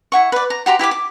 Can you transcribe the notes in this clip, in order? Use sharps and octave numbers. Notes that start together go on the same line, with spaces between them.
E4 F#5 C#6
B4 D5
A#5
F#4 G4 A#5 C6
E4 G4 G5 D6
D6